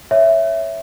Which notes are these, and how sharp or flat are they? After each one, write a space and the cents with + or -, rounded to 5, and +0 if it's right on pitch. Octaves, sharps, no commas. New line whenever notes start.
C#5 +0 E5 +0